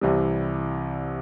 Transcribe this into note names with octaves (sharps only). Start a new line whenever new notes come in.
C2 C3 E3 G3